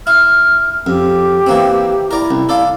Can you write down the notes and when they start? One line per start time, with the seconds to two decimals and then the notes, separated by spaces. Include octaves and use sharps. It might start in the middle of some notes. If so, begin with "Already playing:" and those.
0.07 E4 F6
0.86 F2 G4
1.46 E3 A#3 C4
2.11 E4 A#4 D5 A#5
2.31 C2
2.49 A4 D5 F5